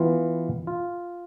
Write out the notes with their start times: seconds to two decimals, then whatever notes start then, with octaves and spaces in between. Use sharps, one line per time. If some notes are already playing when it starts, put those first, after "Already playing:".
Already playing: E3 B3 F4
0.67 F4